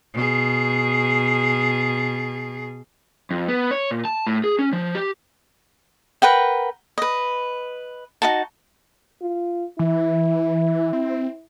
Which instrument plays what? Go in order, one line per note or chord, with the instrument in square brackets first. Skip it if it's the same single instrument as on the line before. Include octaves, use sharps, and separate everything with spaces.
[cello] B2 G#4
[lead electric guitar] F2
B3
C#5
A#2
A5
A2
G#4
C#4
F3
G4
[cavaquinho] A#4 B4 F#5 G5
B4 D#5
D#4 F#4 A5
[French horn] F4
[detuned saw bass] E3 [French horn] E4
[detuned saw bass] C4